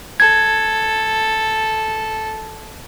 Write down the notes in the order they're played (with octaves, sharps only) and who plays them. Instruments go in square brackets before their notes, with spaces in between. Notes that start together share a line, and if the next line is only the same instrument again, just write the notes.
[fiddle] A4 [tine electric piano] G#6